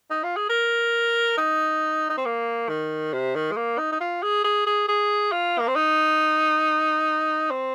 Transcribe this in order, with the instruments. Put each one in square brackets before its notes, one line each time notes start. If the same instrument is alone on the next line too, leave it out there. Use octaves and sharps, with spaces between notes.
[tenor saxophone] D#4
F4
G#4
A#4
D#4
D#4
C4
A#3
D#3
C3
D#3
G#3
A#3
D#4
D#4
F4
G#4
G#4
G#4
G#4
F4
A#3
C4
D#4
C4